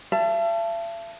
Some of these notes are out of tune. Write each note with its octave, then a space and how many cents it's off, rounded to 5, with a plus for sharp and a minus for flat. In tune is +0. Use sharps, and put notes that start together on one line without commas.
E5 +45 A5 +0